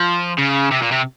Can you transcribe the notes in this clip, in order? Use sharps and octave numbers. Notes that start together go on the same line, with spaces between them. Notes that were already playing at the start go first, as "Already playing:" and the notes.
Already playing: F3
C#3
C3
A#2
C3